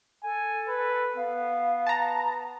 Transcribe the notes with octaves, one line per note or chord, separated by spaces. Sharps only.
A4 G#5
B4
B3 F5
A5 A#5